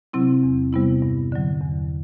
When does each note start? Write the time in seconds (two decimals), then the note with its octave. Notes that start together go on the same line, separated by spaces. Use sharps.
0.13 C3 F#3 C4 E4
0.43 E2
0.73 C3 G3 B3 E4
1.02 G2
1.32 D3 F#3
1.61 E2